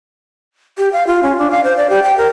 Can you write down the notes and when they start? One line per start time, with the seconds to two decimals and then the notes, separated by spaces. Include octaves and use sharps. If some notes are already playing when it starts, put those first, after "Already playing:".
0.78 G4
0.93 F5
1.07 F4
1.23 C#4
1.38 D4
1.51 F5
1.64 C5
1.77 D5
1.90 G4
2.03 G5
2.18 A#4